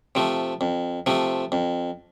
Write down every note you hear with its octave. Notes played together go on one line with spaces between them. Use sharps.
C3 F3 A3
F2
C3 F3 A3
F2